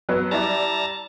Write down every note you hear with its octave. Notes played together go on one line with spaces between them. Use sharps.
F#3 B3
G3 E4 D5 A5 A#5